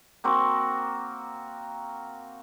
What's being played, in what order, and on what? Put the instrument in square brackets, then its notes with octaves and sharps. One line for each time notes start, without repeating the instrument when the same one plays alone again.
[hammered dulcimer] A#3 C4 F#4 A#4